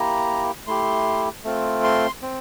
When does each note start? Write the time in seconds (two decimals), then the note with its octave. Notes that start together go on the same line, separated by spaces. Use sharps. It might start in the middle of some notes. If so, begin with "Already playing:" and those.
Already playing: A#3 E4 G4 A#5
0.67 A3 E4 G4 C6
1.44 A3 C4 F4
1.84 C6
2.22 C4